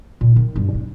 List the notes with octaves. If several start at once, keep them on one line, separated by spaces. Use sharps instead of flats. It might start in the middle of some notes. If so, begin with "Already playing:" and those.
A#2
D#3
G2
D4